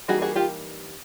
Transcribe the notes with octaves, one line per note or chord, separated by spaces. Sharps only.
E3 G3 A#3 D#4 F#4 G#4
F#4 G#4
F4 G4